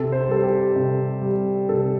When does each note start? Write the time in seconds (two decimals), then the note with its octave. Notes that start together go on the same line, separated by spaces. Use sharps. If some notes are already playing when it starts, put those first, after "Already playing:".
Already playing: C3 A4
0.12 C5
0.28 G3 A4
0.44 G4
0.76 C3
1.22 G3
1.69 C3 A4